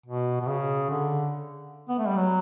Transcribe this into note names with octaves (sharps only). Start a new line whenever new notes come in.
B2
B2
C#3
D3
B3
A3
G3
F#3